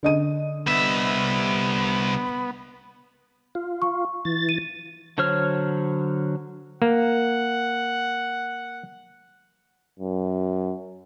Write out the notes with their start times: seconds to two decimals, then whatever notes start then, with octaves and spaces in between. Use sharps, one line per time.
0.03 D3 D#5 D#7
0.67 C2 B3 E5
3.55 F4
3.82 C#6
4.25 E3 A6
4.49 D#7
5.18 D3 F#3 C5 C#5 F6
6.82 A#3 F#5
9.99 F#2